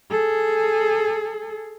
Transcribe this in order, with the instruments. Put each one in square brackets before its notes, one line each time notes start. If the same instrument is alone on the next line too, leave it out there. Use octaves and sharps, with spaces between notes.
[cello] G#4 A4